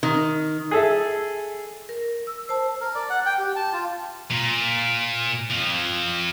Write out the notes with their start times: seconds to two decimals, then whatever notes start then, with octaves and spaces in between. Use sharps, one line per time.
0.03 D#3
0.71 G#4 A4 E5
1.89 A#4
2.27 E6
2.49 C5 A5
2.81 A#4
2.95 D5
3.10 F#5
3.26 G5
3.38 G4
3.56 A5
3.73 F4
4.31 A#2
5.50 F2 F3